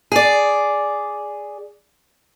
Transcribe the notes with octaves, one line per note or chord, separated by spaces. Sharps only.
G#4 D5